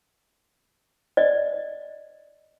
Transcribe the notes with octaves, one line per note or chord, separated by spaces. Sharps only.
D5 D#5